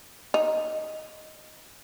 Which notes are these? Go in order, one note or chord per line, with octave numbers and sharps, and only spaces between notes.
D#4